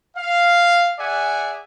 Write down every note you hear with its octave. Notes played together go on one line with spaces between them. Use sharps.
F5
G#4 D5 E5 F#5 G#5